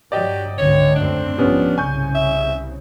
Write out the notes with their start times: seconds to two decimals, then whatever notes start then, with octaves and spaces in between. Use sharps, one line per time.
0.12 G2 F#3 G4 D5 D#5 G5
0.58 G#1 C#2 D3 C#5
0.95 F#2 A3 C4 D4
1.38 A#1 G#2 F3 G3 B3 C#4
1.78 C2 C#3 G#5 C#6 G6
2.15 E5